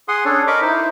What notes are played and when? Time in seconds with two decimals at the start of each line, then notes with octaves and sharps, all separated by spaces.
0.08 G#4 F#5 C6 D#6
0.25 C#4 D4 A4 C#5
0.47 A#4 D#5 B5 C#6 D6
0.62 D#4 E4 C5